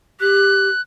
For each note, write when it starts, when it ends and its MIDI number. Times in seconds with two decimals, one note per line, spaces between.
0.20 0.68 67
0.20 0.81 90